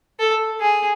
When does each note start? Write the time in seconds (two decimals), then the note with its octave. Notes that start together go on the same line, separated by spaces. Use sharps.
0.19 A4
0.61 G#4